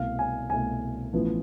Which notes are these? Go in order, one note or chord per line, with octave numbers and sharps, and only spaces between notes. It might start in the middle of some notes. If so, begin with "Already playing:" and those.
Already playing: C2 B2 A3 F5
G#5
C2 B2 A3 G#5
A1 A2 F3 B3